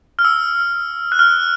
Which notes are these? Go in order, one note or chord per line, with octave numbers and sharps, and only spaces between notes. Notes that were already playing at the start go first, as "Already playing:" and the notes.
F6
E6
F#6
F6